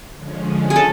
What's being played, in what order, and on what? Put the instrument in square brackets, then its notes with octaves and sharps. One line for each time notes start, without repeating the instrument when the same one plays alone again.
[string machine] D3 F3 G#3 C#4
[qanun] G#4
A4